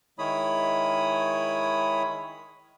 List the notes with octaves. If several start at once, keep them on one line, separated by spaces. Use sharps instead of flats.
D#3 G#3 E4 C#5 B5 D#6